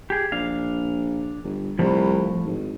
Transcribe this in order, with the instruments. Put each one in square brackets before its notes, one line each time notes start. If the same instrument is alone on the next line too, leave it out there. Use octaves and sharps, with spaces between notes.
[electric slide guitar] G4 G#4
[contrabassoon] A#1 [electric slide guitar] D4 F5
[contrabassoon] G1
[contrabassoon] C2 [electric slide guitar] A2 F3
[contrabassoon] G#1